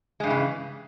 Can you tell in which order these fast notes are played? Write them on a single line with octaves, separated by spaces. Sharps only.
G#3 G2 E3 C#3